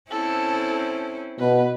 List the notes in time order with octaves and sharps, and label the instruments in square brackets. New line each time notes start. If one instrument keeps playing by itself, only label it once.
[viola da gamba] C4 C#4 E4 [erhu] A4
[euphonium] B2 [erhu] B4